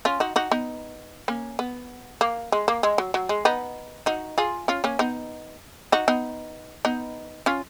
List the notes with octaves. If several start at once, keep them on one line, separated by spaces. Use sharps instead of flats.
C#4 F4
D#4 F#4
D#4 F#4
B3 D#4
A#3 C#4
B3
A#3
G#3
A#3
G#3
F#3
F#3
G#3
B3 D#4
D#4 F#4
F4 G#4
C#4 F4
A#3 C#4
B3 D#4
D#4 F#4
B3 D#4
B3 D#4
C#4 F4